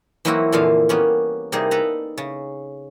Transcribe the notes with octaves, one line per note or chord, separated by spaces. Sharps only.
E3 F#3 A#3 C4 E4 F#4
F2 A#2 D3 E3 F3 F5
G3 A#3 B3 C#4
C3 G3 A#3 D#4 G#4
A4 B4 A#5
C#3